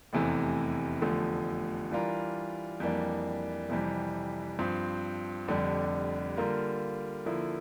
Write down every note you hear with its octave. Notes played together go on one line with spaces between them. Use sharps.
F1 E2 C3 E3 A3
F1 E2 D3 F3 A3
E3 G3 D4 F4 A#4
F2 E3 G3 A#3 D4
F2 C3 E3 G3
G2 F3 C4
F1 F2 D3 G3 D4
D3 G3 A#3 F4 A#4
D3 F3 A#3 E4